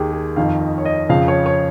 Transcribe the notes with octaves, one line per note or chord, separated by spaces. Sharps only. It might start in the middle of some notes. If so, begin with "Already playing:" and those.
Already playing: D#2 D#3 G4 G#4
G#4
F2 D#3 F5
D#5
C#5
D#5
F2 C#3 F3 F5
C#5
C#5